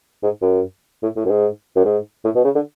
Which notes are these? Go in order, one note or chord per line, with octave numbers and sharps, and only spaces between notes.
G#2
F#2
A2
A2
F#2
G#2
F#2
G#2
A2
B2
C#3
D3